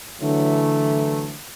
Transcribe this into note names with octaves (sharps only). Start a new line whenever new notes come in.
D3 E3 F#3 A3